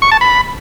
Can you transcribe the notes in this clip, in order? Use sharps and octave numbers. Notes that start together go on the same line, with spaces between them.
C#6
A5
B5